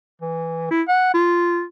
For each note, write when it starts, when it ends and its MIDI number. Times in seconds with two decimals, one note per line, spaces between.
0.21 0.69 52
0.70 0.82 64
0.88 1.13 78
1.13 1.63 65